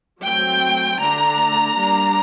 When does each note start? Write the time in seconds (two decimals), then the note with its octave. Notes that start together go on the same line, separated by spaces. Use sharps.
0.23 F#3 A3 C4 G5
1.00 D3 A3 D4 A#5
1.78 G3 A#3 D4